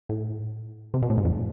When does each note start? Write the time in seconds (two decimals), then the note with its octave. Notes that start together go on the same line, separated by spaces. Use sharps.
0.09 A2
0.94 C3
1.02 B2
1.10 A2
1.18 G#2
1.25 F2